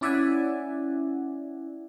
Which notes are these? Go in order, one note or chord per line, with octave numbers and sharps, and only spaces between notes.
C#4 E4 D5 E5 F#5 G#5